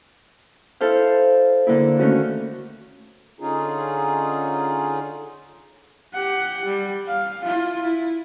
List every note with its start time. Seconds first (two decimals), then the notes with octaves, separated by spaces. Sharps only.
0.81 E4 A4 C5 F5
1.67 D3 A#3 E4
1.99 D#3 A3 C#4 F#4
3.40 D3 C#4 D#4 F4 G#4
6.13 G4 F#5
6.65 G3
7.07 F5
7.44 E4 F4
7.83 E4